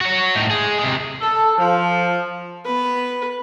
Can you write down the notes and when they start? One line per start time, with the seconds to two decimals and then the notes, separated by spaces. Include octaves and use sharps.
0.01 F#4 C#5
0.35 A2 D#4
0.50 G#3 G#4
0.79 C3 G#3
1.21 A4
1.58 F3
2.65 B3 B4